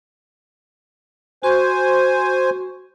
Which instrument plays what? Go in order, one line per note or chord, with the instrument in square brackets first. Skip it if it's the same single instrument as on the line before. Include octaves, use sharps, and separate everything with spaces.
[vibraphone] F#4 C6 C#6 [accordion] C5 G#5